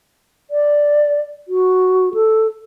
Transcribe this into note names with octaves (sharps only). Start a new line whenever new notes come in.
D5
F#4
A4